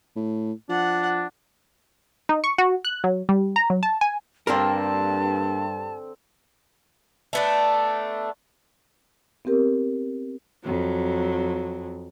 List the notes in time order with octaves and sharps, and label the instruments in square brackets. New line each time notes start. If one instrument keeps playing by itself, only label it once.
[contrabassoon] A2
[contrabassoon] F3 [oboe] D4 [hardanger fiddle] F#5
[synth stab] D#4
C#6
F#4
F#6
F#3
G3
A#5
F#3
A5
G#5
[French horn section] G2 [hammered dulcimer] D3 C4 [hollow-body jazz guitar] A#3 D4 A#4 [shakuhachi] A5
[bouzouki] A3 B3 D4
[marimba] B3 C4 G4 A#4
[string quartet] F2 F#3